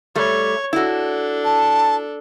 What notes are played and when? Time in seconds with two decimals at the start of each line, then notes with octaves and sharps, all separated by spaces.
0.16 G3 A3 C#5
0.73 D4 E4 F#4 A4
1.45 A5